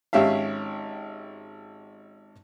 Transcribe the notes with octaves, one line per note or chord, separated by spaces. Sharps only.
G#1 C#4 G4 E5 F5